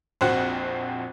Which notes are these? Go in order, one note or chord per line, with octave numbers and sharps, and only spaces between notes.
A#1 F2 C4 F#4 C5 F#6